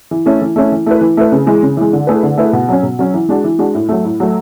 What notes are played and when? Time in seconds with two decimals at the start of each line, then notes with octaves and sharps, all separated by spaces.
0.11 E3
0.26 A3 C#4 E4 A4
0.41 E3
0.56 A3 C#4 E4 A4
0.72 E3
0.86 A3 E4 B4
1.01 E3
1.17 A3 E4 B4
1.32 C#3
1.47 E3 G#3
1.63 C#3
1.77 E3 G#3
1.93 D3
2.07 A3 E4 G#4 B4
2.23 D3
2.37 A3 E4 G#4 B4
2.53 B2
2.69 F#3 C#4
2.83 B2
2.99 F#3 C#4
3.14 E3
3.29 G#3 D4 F#4
3.44 E3
3.59 G#3 D4 F#4
3.75 A2
3.89 F#3 A3
4.05 A2
4.20 F#3 A3